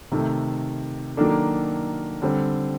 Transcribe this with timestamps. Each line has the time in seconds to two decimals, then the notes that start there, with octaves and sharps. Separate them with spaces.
0.12 C3 D#3 A3
1.17 D#3 F#3 A#3 D4 A4
2.22 D3 G3 C4